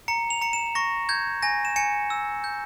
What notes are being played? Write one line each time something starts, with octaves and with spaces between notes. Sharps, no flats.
A#5 C#7
F7
A#5 C#7
E7
C#6 A#6
G6 G#6
G#5 A#6
E7
G#5 C#7
E6
G6